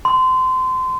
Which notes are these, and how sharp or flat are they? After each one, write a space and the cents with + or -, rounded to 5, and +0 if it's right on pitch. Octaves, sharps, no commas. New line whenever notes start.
C6 -25